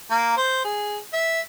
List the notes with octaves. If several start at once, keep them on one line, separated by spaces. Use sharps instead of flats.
A#3
C5
G#4
E5